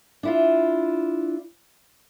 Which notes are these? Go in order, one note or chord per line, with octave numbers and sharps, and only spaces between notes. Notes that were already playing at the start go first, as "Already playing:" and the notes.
D4 E4 F4